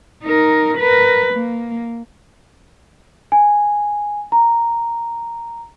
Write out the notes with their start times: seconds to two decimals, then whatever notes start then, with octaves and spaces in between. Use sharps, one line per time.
0.24 D#4 A#4
0.78 A#4 B4
1.34 A#3
3.32 G#5
4.32 A#5